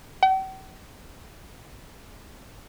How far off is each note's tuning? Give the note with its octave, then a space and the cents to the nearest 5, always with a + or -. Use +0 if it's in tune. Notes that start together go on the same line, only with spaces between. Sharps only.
G5 -45